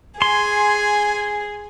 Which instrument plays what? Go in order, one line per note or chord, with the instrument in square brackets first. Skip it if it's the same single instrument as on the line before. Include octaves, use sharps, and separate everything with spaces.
[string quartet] G#4 [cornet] G#5 [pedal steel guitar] C6